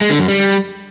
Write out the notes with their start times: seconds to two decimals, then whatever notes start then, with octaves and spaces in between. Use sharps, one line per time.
0.01 G#3
0.10 D3
0.19 F#2
0.28 G3